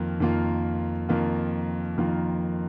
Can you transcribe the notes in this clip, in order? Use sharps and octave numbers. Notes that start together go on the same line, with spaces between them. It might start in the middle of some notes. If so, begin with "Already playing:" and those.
Already playing: F2 D#3 A#3 F4
F2 D#3 A#3 F4
F2 D#3 A#3 F4
F2 D#3 A#3 F4